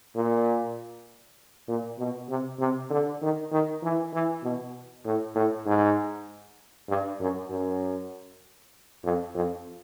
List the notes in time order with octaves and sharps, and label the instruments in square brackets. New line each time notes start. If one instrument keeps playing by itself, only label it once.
[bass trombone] A#2
A#2
B2
C3
C3
D3
D#3
D#3
E3
E3
B2
A2
A2
G#2
G2
F#2
F#2
F2
F2